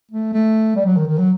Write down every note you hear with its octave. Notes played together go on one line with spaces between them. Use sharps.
A3
A3
G3
F#3
D#3
D#3
F#3